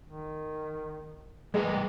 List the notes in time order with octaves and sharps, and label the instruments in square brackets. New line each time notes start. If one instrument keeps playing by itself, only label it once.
[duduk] D#3
[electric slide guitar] G3 A#4 B4 [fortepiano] G#3 [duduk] G#4